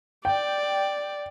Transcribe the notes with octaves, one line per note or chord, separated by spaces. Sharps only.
D5 G5